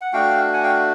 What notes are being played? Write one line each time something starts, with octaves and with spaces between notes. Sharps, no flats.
F#5
A3 D4 F#4 F5 G5
F#5 G#5
F5 G5